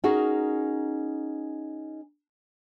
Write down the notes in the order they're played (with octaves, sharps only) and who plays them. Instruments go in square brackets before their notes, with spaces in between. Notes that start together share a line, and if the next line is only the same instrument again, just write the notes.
[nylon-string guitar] C#4 D#4 F#4 G#4 A#4